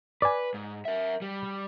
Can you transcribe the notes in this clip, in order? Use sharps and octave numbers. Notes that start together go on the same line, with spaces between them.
B4 D5 G#5
G#2
A#4 E5
G3